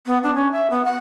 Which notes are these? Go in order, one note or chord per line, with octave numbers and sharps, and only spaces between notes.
B3
D4
C#4
E5
B3
F#5